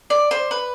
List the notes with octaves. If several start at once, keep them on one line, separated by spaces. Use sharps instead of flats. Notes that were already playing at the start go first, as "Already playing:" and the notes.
D5
C5
B4